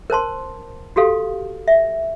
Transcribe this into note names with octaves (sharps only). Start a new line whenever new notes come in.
A#4 C5 A5 C6
F#4 G4 A4 F5
E5